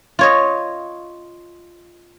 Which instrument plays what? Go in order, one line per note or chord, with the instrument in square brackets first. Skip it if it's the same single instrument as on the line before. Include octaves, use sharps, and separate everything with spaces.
[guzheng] F4 C#5 D#5